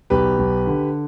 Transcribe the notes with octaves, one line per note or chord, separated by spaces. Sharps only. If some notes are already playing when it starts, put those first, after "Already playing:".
B1 G4 B4
B1
D3